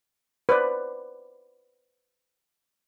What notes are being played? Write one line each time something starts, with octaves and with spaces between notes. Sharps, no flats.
B4 C5 D5